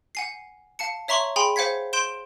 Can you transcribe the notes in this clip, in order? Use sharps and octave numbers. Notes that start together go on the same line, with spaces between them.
F#5 G#5 C7
F5 A5 C#7
C#5 E5 A#5 C6 C#6 F#7
G#4 G5 G#5 B5 C6
C5 F5 F#5 G#6 B6
C6 G6 D7 E7 G7